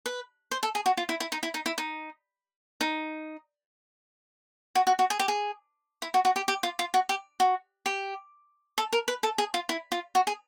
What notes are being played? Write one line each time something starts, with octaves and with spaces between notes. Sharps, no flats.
B4
C5
A4
G#4
F#4
F4
E4
E4
D#4
E4
D#4
E4
D#4
D#4
F#4
F#4
F#4
G#4
G4
G#4
E4
F#4
F#4
G4
G4
F4
F4
F#4
G4
F#4
G4
A4
A#4
B4
A4
G#4
F4
E4
F4
F#4
G#4